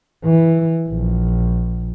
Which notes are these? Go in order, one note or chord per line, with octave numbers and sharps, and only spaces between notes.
E3
A#1